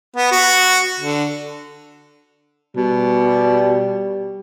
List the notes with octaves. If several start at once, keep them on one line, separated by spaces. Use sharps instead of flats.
B3
F#4
D3
B2 G3